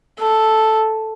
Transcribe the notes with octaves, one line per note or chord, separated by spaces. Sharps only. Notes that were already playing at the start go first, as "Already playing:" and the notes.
A4